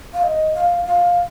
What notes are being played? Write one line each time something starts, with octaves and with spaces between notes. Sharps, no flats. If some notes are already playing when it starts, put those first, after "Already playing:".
F5
D#5
F5
F5